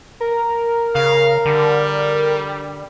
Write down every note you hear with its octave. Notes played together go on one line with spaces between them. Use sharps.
A#4
C#3 F5
D3 G3